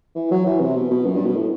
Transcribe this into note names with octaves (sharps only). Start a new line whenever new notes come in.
E3
F#3
E3
C3
B2
B2
F#2
G2
B2
A2